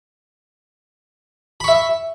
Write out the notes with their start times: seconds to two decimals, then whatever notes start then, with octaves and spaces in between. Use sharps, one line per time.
1.60 B5
1.64 C#6
1.68 E5